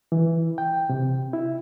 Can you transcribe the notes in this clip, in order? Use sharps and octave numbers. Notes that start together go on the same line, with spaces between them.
E3
G5
C3
E4